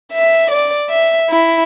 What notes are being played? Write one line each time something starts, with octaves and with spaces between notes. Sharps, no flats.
E5
D5
E5
E4